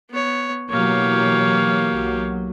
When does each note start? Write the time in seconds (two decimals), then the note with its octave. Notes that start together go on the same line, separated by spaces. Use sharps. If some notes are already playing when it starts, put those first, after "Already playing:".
0.10 B3 C#5
0.70 B2 E3 F#3 A#3 G4 C#5 F5
1.89 B1 F#3